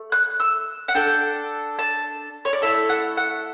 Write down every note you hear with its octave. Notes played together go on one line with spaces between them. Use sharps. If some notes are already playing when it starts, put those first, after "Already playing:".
Already playing: A3
F#6
E6
F#5
D4 A4 G5
A5
C#5
D5
A3 E4 A4 E5
F#5
F#5